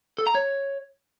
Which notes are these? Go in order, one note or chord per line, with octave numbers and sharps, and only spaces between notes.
A4
A#5
C#5